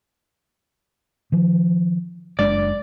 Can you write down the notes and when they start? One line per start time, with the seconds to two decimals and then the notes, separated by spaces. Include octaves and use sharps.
1.32 D#3 F3
2.39 F#1 G#3 D4 D5